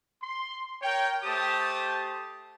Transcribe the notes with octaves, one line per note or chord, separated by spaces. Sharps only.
C6
A#4 C#5 G5
A3 G4 C5 A5 D#6